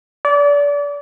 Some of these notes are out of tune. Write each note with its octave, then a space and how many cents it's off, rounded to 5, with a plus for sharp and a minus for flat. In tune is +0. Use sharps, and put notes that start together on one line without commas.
D5 -30